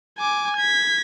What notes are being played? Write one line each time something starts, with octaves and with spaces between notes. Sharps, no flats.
G#5 D6
G#6 B6